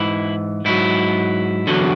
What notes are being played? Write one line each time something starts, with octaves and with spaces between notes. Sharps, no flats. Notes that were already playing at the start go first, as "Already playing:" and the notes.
Already playing: G#2 E3 E4
G#2 F#3 E4
E2 D3 F#3